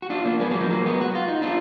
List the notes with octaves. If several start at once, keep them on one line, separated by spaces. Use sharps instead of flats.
F#4
D4 F4
A#3 D4
G#3 B3
F#3 A#3
F3 G#3
F#3 A#3
G#3 B3
F#4
F4
D#4
D4 F4